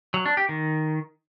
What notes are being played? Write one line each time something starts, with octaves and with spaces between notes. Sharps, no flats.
F#3
D4
G4
D#3